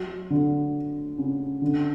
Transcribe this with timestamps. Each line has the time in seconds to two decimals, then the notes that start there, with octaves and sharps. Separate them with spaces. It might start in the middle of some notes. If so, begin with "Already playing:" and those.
Already playing: F#3
0.30 D3
1.18 C#3
1.62 D3